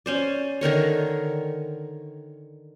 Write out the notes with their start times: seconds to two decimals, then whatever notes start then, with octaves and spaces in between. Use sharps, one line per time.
0.06 C#4 C5 D5
0.61 D3 D#3 A#4 C#5